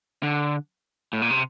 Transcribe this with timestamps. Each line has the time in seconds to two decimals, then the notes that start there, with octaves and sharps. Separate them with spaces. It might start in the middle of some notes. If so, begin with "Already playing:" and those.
0.23 D3
1.13 A2
1.22 A#2
1.31 C3